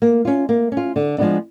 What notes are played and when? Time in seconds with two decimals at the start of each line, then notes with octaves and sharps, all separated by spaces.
0.02 A#3
0.25 C#4 F4
0.49 A#3
0.72 C#4
0.77 F4
0.96 D3
1.18 F3 G#3 B3 D4